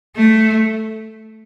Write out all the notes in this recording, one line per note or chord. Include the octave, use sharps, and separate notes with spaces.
A3